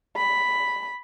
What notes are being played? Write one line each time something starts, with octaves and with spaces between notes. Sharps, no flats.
B5